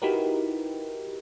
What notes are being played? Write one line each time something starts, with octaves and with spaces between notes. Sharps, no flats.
D#4 E4 F#4 G4 A#4 B4